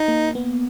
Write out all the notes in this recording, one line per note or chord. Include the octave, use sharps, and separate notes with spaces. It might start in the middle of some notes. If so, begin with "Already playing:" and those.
Already playing: D#4
A#3
B3